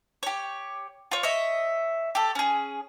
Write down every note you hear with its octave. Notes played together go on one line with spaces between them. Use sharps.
G4 C#5
F4 C#5
C#5 D#5 E5
G4 A4
C#4 G#4